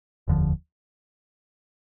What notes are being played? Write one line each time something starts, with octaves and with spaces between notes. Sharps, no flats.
F1 D#2 D3 F3